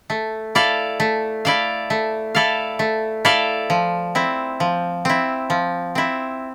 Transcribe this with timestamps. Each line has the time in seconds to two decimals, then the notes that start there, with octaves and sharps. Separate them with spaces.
0.10 A3
0.55 E4 A4 D5 F5
1.00 A3
1.45 E4 A4 D5 F5
1.90 A3
2.35 E4 A4 D5 F5
2.79 A3
3.25 E4 A4 D5 F5
3.70 F3
4.15 C4 E4
4.60 F3
5.05 C4 E4
5.50 F3
5.95 C4 E4